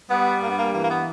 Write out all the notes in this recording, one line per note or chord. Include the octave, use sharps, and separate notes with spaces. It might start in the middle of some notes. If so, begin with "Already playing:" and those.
G3 B3
G2 A#3
B3
A#3
E3 A#3
A#3
B3